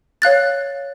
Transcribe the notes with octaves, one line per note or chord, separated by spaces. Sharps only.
C#5 F5 F#6 A6